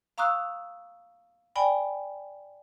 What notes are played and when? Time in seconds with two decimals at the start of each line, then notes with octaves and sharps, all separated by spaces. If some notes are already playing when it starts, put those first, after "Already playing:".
0.18 F5 A#5 C#6 D#6 E6 F#6
1.56 D5 G5 G#5 B5